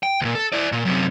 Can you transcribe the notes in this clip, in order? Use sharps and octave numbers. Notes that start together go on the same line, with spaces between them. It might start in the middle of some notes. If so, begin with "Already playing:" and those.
G5
D2 A#2
A4
E4 D5
A#2
F#2 C3